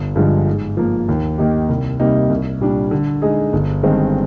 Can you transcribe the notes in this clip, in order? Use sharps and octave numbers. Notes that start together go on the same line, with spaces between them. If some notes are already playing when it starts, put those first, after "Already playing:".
Already playing: G1
G2 D3 F3 G#3
G#2
F3 A#3
D#2
D#3 A#3 D#4 G4
C2
C3 G3 A#3 D#4
C2
A#2 G3 D4
D3
G#3 D#4 G#4
G1
G2 D#3 G#3 C4